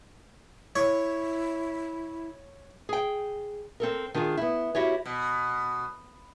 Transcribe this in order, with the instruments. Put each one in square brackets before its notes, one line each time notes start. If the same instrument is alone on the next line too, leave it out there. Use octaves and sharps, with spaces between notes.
[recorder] E4 [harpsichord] C#5
[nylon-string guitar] G#4 G5
C4 A4 A#4
D#3 D4 F4 F#4 G#4
B3 E4
E4 F#4 G4 C#5
[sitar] B2